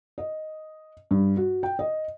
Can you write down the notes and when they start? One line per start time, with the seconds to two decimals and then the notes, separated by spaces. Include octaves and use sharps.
0.18 D#5
1.11 G2
1.37 F#4
1.63 G5
1.79 D#5